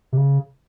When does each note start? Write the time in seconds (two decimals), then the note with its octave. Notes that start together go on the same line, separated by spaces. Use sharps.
0.12 C3
0.17 C#3